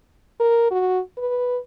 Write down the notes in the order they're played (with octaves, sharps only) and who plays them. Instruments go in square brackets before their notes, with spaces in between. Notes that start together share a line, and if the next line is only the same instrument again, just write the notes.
[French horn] A#4
F#4
B4